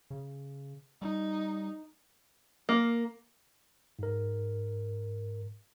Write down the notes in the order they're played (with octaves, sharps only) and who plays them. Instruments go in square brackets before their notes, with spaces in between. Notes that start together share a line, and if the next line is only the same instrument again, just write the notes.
[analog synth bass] C#3
[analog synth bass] G3 [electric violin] D#4
[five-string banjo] A#3
[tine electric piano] G#2 A#4